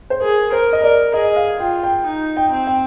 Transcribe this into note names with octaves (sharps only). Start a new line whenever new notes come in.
C5
G#4 A#4
A#4 C5
D#5
A#4 D5
G#4 D#5
F5
F4 G5
G5
D#4
G5
C4
G5